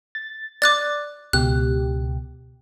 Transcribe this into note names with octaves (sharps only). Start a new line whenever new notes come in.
A6
D5 D6 F#6 A6
C#2 B2 G4 F#6